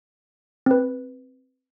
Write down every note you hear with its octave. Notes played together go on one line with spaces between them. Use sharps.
C4 B4